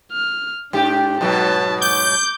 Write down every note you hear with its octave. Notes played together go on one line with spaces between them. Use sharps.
F6
G#2 D4 G4
G#2 B2 F#3 B4 A5
D6 G6